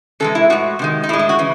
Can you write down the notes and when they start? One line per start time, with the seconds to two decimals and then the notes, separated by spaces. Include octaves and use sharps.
0.20 C3 E3 G#3 A4
0.35 E4
0.50 A2 G#3 F#4
0.79 C3 D#3 G#3
1.04 D#4
1.09 A2 G#3 E4
1.19 E4
1.29 F#4
1.39 C#3 E3